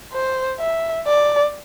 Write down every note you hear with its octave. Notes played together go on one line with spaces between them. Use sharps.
C5
E5
D5